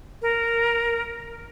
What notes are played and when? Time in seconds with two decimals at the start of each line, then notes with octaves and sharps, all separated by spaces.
0.22 A#4